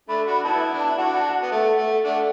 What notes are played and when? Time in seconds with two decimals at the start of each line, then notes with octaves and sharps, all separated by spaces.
0.09 A3 D4 B5
0.26 D4 F#4 B5
0.44 B3 E4 A5
0.74 D4
0.80 A5
0.87 E4
0.98 D4 F#4 F#5
1.16 A5
1.34 F#5
1.43 B3
1.52 A3 F#5
1.78 A3
2.05 A3 D4 F#5